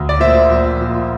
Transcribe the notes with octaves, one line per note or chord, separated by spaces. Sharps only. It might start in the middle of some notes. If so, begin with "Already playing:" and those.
Already playing: D2
D5
A#2 C5 E5
A#1
A#2